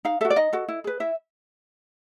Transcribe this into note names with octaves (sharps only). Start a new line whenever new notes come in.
D#4 F5
F#4 A4 E5
D5
D#4 D#5
F#4 A4
E4
G#4 B4
E4 E5